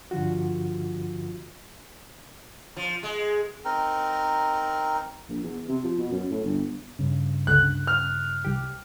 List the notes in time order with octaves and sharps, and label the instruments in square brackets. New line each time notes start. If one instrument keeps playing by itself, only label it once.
[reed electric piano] G2 D3 F3 F4 F#4
[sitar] F3
G#3
[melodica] C4 D#4 A#4
[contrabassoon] A#1
E2
C3
F3
B2
F#2
A2
G1
[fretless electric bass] G2 C#3
[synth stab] C#2 D3 [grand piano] F#6
[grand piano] F6
[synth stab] C2 G4